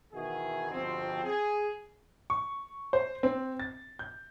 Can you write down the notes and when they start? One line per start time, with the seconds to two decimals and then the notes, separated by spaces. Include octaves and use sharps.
0.14 B2 D#3 E3 E4 F#4 G#4
0.71 G1 B2 F3 C4
1.24 G#4
2.30 C#6
2.93 C5
3.23 C4
3.60 A6
3.99 G6